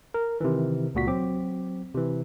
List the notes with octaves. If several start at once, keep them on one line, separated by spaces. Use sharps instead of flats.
A#4
C3 D#3 E3
C#2 A#2 F#4 B6
F#3 C4 D6
C3 E3